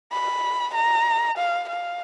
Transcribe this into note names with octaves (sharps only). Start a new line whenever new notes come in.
B5
A#5
F5
F5